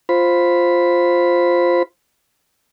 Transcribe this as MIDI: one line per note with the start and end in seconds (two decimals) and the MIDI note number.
0.09 1.83 65
0.09 1.83 72
0.09 1.83 83